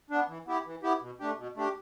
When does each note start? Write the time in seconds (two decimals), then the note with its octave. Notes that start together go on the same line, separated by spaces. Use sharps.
0.10 B3 D4
0.28 E3
0.47 B3 E4 G4
0.66 E3
0.83 B3 E4 G4
1.01 B2
1.20 A3 D4 G4
1.38 B2
1.56 A3 D4 G4